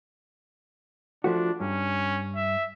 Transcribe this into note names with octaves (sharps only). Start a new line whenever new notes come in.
F3 A3 D4 F#4
G2 C#4
E5